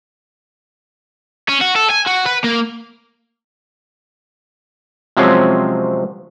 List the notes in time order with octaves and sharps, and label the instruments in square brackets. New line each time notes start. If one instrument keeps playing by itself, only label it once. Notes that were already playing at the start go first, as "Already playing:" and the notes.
[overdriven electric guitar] C#4
F#4
A4
G#5
F#4
B4
A#3
[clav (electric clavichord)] C3 F3 F#3 G#3 C4 C#4